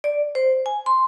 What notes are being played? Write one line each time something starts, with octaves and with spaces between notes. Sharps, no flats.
D5
C5
G#5
C6